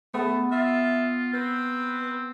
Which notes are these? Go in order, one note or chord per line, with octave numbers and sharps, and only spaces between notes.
A3 B3
F4 E5
C4 B4